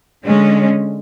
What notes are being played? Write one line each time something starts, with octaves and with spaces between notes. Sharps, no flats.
D3 G#3 C#4